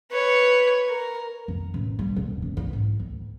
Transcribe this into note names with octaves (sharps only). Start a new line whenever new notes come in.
B4 C#5
A#4
F2
A1
G3
D#1
F#2
E4
G#2
D2